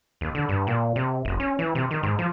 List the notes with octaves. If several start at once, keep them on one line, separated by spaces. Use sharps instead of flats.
D#2
D3
G2
A#2
C3
F#1
C#4
E3
C3
D#3
G#2
F3